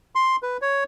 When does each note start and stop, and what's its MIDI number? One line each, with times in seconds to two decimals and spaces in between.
0.15 0.36 84
0.43 0.57 71
0.62 0.84 73